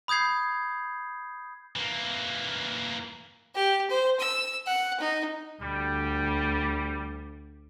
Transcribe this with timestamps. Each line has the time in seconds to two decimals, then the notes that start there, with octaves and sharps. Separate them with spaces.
0.08 B5 D#6 G6 G#6 C7
1.76 E3 A#3
3.55 G4
3.90 C5
4.19 E6
4.67 F#5
5.00 D#4
5.62 D2 G3